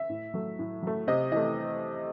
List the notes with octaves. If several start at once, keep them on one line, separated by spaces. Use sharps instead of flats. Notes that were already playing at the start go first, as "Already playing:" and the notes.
Already playing: E5
A2
F#3 A3
A2
F#3 A3
C3 D#5
E3 A3 D#5